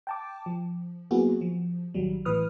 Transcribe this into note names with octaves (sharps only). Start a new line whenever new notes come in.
G5 A5 D6
F3
F#3 A#3 B3 E4 F#4 G#4
F3
A1 D#3 F#3 G3
A2 E3 B4 D#6 F6